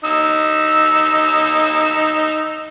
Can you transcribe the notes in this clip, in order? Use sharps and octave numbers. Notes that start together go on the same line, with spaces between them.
D#4 E6